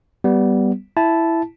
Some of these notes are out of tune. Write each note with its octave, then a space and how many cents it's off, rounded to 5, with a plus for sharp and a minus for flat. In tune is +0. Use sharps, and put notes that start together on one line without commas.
G3 -10 B3 +0
E4 +5 A5 -10